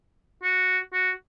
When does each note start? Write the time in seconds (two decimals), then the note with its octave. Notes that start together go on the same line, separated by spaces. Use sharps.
0.43 F#4
0.93 F#4